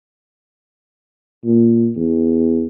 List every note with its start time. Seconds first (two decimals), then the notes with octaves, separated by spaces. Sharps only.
1.45 A#2
1.96 E2